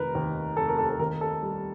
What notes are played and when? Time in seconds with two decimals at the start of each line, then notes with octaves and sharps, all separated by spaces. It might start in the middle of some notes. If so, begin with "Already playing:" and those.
Already playing: F1 D#3 A#4 B4
0.15 D#2
0.57 F1 A4
0.68 A#4
0.78 A4
0.90 A4
0.99 D#2 A#4
1.21 A4
1.43 G3